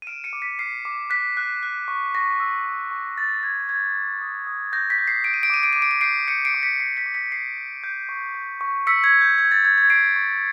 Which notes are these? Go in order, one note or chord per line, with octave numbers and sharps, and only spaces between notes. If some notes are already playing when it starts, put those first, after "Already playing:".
D#7
F6 D7 E7
C#7 D#7
D6
B6 C#7
F6 C7
D6
F#6 B6
F#6
F#6
C#6
C#6 A#6
E6
E6
C#6
G6 A6
G6 G#6
G6 G#6
D6
D#6
D#6
G6 A#6
B6
G6
C7
G6 D7
D#7
D7
D6 D#7
D7
D6 D#7
D7
D#7
G6 C7 D7
G6 C#7 D#7
C7 D7
D6
B6 C#7
G6 C7
B6 C#7
D6
B6 C#7
G6 C7
G6
G6
C#6
G6
C#6
E6 B6 C#7
G#6
E6
G6
G6 G#6
A6
G6 G#6
G#6
C#6 C7 D7
C#6